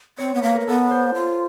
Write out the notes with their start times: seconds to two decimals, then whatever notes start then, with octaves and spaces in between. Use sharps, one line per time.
0.18 C4 C#5
0.35 B3
0.42 A#3 B4
0.55 A#4
0.60 A#3
0.67 B3 A4
0.91 C5
1.15 F4